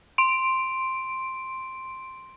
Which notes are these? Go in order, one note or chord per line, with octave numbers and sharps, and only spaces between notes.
C6 D7